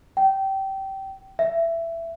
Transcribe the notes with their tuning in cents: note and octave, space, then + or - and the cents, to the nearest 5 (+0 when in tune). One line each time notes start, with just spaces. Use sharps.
G5 -20
E5 +15